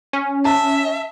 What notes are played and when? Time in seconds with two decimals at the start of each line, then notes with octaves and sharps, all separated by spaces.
0.13 C#4
0.45 E5 A5